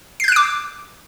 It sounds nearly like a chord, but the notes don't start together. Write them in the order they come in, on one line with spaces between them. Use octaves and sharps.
C7 G6 F#6 D7 D6